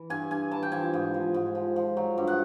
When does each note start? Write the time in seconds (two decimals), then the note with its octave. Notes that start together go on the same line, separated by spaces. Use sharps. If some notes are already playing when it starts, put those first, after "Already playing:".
Already playing: E3
0.10 G2 G#5
0.31 G2 G#5
0.51 E3 A5
0.63 G5
0.72 F3 G#5
0.94 G#2
1.14 F3
1.34 G#2
1.55 F3
1.76 F3
1.97 F#3
2.18 G2
2.27 F#5